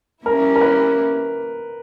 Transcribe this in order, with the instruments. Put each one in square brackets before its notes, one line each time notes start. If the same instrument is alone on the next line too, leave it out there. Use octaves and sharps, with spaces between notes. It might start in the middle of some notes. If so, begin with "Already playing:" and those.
[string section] G3 A#3 C#4 E4 [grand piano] A#4
[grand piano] A#4
B4